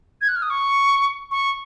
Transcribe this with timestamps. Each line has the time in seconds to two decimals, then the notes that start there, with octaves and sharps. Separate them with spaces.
0.21 G#6
0.28 F#6
0.36 F6
0.42 D#6
0.50 C#6
1.31 C#6